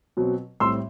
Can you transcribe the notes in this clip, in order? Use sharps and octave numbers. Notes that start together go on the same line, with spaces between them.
B2 F#3 C4
A2 G3 C4 C6 E6